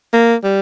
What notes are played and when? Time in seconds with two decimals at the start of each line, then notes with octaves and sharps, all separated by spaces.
0.13 A#3
0.44 G3